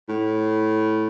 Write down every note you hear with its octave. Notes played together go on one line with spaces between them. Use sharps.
A2